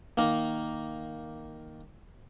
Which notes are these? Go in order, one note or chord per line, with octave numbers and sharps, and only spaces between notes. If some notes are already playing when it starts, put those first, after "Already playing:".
D#3 A#3